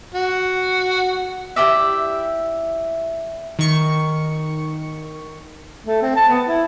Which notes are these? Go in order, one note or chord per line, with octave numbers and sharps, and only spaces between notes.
F#4
E4 G4 D5 E5
D#3 C#6 C#7
A3
C4
A5
B3
E4